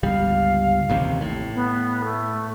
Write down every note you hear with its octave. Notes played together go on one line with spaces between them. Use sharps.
G1 C#2 G3 F5
A1 D#2 C3
A2
B3
A3